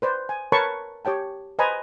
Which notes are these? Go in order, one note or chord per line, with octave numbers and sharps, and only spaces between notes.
B4 C5 D5
G#5
A#4 B4 C#5 A5 B5 C#6
G4 C#5 G5 A5
B4 C5 D#5 G#5 A#5 B5